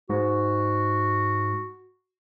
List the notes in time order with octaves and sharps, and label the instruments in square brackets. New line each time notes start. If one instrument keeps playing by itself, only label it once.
[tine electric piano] G#2 [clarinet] F#4